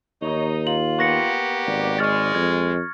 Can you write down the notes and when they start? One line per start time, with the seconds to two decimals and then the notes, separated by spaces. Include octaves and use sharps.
0.22 D#2 D#4 C#5
0.67 F4 F#7
0.99 A#3 B3 G4 C#6 A#6 C#7
1.67 G#1 D5
1.99 G#3 C#6 F6 A6
2.35 F2 G#6